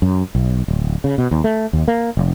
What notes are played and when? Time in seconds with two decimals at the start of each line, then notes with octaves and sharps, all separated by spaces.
0.02 F#2
0.35 B1
0.68 D1
1.04 C#3
1.18 B2
1.31 D#2
1.44 A3
1.73 D#2
1.88 A#3
2.17 F1